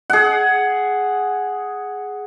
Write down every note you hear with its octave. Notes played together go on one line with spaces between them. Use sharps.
G#4 F#5